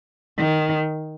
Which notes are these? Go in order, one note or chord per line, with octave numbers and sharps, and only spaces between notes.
D#3